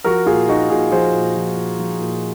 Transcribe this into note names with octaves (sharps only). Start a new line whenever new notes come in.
F3 F#4 A#4
A#2 F4 G#4
F3 D#4 F#4
A#2 F4 G#4
F3 G#4 C5
A#2
F3
A#2
F3
A#2